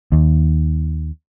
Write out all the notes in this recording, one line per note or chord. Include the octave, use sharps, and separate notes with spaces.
D#2